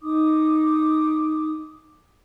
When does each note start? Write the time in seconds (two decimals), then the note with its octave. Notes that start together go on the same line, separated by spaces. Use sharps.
0.01 D#4 D6 D#6